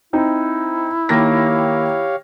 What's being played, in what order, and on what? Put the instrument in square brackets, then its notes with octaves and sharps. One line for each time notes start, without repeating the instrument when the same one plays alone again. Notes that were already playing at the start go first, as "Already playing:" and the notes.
[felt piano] C4 D#4 [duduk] E4
[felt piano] D#3 A#3 A#6 [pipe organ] G4 C#5 F5